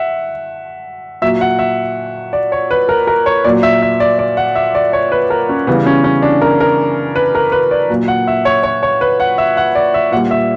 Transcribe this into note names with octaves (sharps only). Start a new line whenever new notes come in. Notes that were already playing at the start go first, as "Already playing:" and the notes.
Already playing: E5 F#5
A#2 F#3 E5
F#5
E5
D5
C#5
B4
A#4
A#4
C#5
A#2 F#3 D5
E5
E5
D5
D5
F#5
E5
D5
C#5
B4
A#4
C#4
C#3 E3 G3 B3
C#4
C#4
D4
A#4
A#4
B4
A#4
B4
D5
A#2 F#3
F#5
E5
C#5
C#5
C#5
B4
F#5
E5
F#5
D5
E5
A#2 G3 F#5
E5